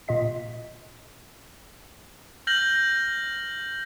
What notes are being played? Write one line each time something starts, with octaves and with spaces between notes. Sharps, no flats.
A#2 F4 D#5 B6
F6 G6 A#6 F#7